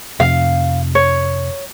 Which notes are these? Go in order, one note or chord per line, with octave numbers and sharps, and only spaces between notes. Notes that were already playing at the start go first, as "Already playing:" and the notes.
F2 C3 F5
C#5